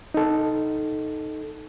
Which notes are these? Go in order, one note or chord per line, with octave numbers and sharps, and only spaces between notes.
D#4 A4